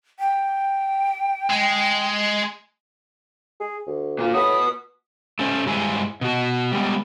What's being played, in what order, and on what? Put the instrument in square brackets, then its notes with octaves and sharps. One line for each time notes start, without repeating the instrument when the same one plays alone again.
[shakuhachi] G5
[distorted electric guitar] G#3
[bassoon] G#4
D2
[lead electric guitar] A#2 F4
[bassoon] A2 [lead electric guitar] F#4 B4 [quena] D#6
[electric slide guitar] A3 C#4 C5
G2 G#3 E4 C5 G#5
B2 F#4
G3 G#3 B3